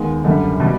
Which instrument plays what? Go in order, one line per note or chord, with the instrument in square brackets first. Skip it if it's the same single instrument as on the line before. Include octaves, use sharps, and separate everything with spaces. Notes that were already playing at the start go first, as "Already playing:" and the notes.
Already playing: [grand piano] D#2 D#3 G#3 B3
F#2 D3 G3
B2 G3